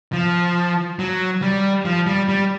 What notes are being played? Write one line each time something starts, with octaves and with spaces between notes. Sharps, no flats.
F3
F#3
G3
F3
G3
G3